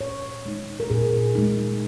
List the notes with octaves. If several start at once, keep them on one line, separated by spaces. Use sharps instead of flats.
A#2 C#5
G#3 D#4
A#4
A#2 G#4
G#3 D#4